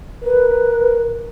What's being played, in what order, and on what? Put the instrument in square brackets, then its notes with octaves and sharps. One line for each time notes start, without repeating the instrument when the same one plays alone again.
[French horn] A#4 [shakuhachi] B4